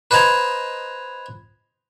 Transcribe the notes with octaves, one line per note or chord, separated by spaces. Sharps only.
B4 C5 D#5 G#5 A#5